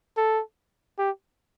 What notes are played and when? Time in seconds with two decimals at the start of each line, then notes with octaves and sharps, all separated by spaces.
0.17 A4
0.98 G4